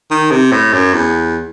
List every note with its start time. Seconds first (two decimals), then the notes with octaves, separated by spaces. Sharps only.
0.10 D#3
0.31 C3
0.51 A2
0.73 F#2
0.93 E2